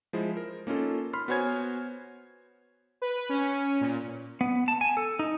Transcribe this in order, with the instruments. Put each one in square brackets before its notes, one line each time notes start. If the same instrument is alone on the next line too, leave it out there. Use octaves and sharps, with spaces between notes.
[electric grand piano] F3 G#3 E4 C5
A#4
A#3 C#4 D#4 F4 A4
B5 C6 F6
B3 F#4 C5 C#5 G#5 G#6
[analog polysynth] B4
C#4
A#2
[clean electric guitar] B3
A5
G#5
A4
D#4